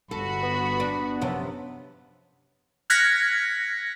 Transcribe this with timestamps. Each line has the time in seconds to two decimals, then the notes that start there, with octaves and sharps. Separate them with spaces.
0.11 G1 F#4 A4 B5
0.43 B3
0.80 D4
1.21 F#2 C3 F3
2.90 F6 F#6 G#6 A#6 B6 C#7